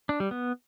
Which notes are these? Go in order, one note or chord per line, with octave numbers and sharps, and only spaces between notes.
D4
G3
B3